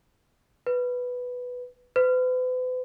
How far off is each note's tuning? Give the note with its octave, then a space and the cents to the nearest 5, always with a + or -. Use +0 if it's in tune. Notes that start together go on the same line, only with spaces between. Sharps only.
B4 +0
B4 +45